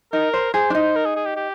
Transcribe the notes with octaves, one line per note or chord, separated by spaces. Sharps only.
D#4 A#4
C5
G#4 C5
D4
D#4
A#4
G#4
G#4
G4
G4